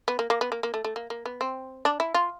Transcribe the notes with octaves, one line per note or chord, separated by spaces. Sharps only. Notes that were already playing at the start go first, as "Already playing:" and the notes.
B3
A#3
A#3
B3
A#3
A#3
A3
A3
A#3
A#3
B3
C4
D4
E4
F4